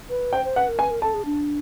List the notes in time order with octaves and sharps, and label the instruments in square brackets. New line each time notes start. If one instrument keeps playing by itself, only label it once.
[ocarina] B4
[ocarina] C5 [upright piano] G5
[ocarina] C5
[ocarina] B4 [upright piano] F#5
[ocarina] A#4
[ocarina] B4 [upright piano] G#5
[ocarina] A#4
[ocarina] A4 [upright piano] A5
[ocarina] G#4
D4